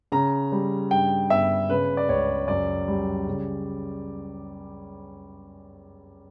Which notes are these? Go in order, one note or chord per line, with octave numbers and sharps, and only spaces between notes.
C#3 A#5
G3
G2 G5
G1 E5
C#3 B4
D5
C#2 C#5
F#2 D5
G3
C#3